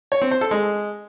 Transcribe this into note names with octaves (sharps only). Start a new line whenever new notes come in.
C#5
C4
C5
A4
G#3